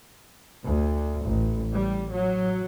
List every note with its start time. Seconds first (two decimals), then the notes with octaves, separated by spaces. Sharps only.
0.64 D2
1.25 A1
1.74 G3
2.11 F#3